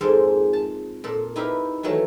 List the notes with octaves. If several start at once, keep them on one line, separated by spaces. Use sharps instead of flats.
F2 G#2 A#3 G#4 A4 C5
A5
A#2 A4
D#4 E4 G4 B4 F5
D#3 E3 F#3 A3